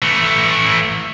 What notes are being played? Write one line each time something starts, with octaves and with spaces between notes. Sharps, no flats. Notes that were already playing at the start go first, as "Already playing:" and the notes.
E3 A3